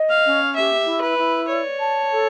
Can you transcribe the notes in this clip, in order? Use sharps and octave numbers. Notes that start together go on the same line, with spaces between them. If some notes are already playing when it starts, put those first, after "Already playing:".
Already playing: D#5
F5
C#4
G4 E5
E4
B4
E4
C#5 D5
A5
A4